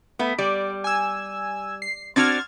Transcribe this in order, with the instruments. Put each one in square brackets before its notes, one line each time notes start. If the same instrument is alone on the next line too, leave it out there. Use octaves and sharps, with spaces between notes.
[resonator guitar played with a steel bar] A3 B3
[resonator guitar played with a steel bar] G3 [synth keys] D5
[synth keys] G#5 E6
C7
[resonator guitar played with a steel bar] C4 D4 F#4 [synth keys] F6 G#6 A6